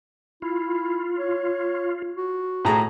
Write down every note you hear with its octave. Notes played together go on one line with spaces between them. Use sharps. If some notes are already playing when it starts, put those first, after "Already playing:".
E4 F4
C#5
F#4
A2 G#4 A#5